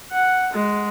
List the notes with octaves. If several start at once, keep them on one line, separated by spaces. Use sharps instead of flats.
F#5
G#3